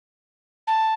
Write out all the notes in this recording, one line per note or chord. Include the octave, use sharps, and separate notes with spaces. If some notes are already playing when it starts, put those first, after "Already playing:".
A5